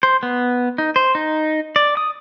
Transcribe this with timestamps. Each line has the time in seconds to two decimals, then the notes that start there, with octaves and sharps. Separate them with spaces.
0.03 C5
0.23 B3
0.78 D#4
0.96 C5
1.15 D#4
1.76 D5
1.97 D#6